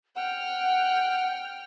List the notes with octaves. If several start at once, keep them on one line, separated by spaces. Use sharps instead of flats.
F#5 G5 F6